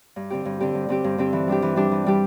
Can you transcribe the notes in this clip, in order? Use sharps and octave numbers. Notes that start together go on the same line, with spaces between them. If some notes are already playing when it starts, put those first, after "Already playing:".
G2
D3 C4 G4
G2
D3 C4 G4
G2
D3 C4 G4
G2
D3 C4 G4
E3
G3 D4 G4
E3
G3 D4 G4
E3
G3 D4 G4